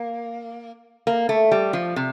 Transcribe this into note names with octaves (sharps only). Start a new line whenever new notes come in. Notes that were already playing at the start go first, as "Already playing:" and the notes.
Already playing: A#3
A#3
A3
G3
F3
C3